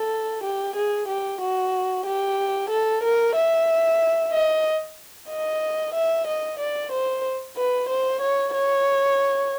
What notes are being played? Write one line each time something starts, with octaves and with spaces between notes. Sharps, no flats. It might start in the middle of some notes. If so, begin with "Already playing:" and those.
Already playing: A4
G4
G#4
G4
F#4
G4
A4
A#4
E5
D#5
D#5
E5
D#5
D5
C5
B4
C5
C#5
C#5